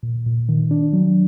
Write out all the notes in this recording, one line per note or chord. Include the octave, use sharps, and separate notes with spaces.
A#2
A#2
D#3
D4
F#3